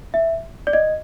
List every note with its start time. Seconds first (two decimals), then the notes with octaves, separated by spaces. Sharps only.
0.14 E5
0.67 D5
0.73 D#5